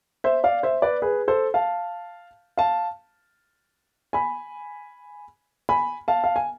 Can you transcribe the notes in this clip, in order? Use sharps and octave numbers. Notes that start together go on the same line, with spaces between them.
C5 E5
D5 F5
C5 E5
B4 D5
G#4 B4
A4 C5
F5 A5
F5 A5
G#5 B5
G#5 B5
F5 A5
F5
G#5